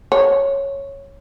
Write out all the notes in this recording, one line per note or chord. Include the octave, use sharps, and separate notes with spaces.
C#5